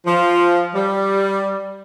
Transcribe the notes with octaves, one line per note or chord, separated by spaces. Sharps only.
F3
G3